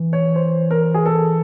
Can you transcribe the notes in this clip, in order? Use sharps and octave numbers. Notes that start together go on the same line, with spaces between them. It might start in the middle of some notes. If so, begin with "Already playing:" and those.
Already playing: E3
C#5
C5
A#4
G#4
A4